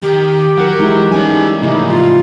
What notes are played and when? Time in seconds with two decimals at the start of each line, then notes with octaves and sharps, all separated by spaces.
0.03 D#3 G4
0.58 F#3 A#4 F#5
0.79 E3 G#3 D#4 E4
1.12 G3 C#4 A4 G#5
1.62 A2 C#3 F3 A#3 D#4 E4
1.88 F4